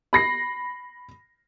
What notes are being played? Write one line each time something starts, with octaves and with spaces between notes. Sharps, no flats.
B5 A#6 C7